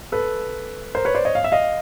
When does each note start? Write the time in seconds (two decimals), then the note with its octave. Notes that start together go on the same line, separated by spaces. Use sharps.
0.12 A4 B4
0.95 A#4 C5
1.05 B4 C#5
1.15 C5 D5
1.25 C#5 D#5
1.35 F5
1.44 E5
1.52 D#5 F5